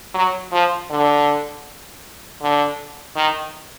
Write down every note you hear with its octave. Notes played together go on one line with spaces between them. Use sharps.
F#3
F3
D3
D3
D#3